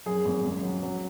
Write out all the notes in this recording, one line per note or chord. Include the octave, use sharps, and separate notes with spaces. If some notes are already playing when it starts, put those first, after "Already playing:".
F#2 G#4
G#1
C#2
F#3
F#3